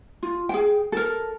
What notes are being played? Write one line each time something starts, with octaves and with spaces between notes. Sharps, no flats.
F4
G#4 G5
A4 A#4